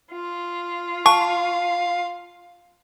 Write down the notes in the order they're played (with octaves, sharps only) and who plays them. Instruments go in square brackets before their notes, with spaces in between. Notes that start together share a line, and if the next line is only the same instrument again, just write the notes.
[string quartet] F4
[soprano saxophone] F5 [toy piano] A5 [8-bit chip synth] C#6